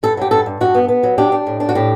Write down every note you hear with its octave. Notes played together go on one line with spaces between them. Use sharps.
G2 A4
F#3 G4
G2 A4
G2
G2 F#4
B3
B3
F#3
D4 G4
D4
A2
D4
F#4
A2 G4